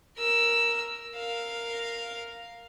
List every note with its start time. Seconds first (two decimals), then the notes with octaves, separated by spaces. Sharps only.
0.17 A#4 E6
1.16 A#4 F5